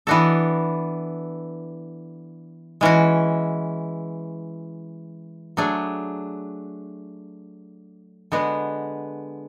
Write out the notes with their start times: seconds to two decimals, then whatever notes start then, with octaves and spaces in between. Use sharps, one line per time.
0.07 E3 B3 D4 F#4 A4
2.81 E3 G#3 C#4 F#4
5.57 F#3 A3 D4 G#4
8.32 D3 G#3 B3 F#4